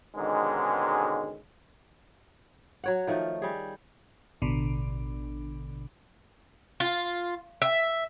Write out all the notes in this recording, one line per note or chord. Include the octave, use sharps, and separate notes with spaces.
G#2 B2 D3 D#3 G#3 C#4
F#3 C#5 F#5
D#3 F3 A3
G3 G#4
A1 B2 D3 D4
F4
E5